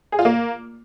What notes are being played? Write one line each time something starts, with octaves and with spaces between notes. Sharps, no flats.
G#4
F4
A#3